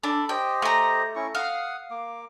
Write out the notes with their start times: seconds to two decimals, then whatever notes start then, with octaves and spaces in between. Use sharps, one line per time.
0.03 D4 A4 B5
0.29 G4 C5 D#5 G5
0.62 A3 A#5
1.16 C#4 E4 C#6
1.35 F5 F#5 D#6
1.91 A#3 D6